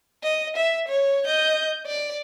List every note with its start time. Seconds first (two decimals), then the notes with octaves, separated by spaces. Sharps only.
0.23 D#5
0.56 E5
0.88 C#5
1.25 D#5 G6
1.86 D5